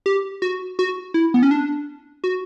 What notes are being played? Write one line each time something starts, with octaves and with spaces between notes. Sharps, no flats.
G4
F#4
F#4
E4
B3
C#4
D4
F#4